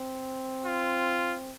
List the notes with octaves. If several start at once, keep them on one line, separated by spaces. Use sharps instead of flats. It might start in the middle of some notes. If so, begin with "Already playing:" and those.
Already playing: C4
F4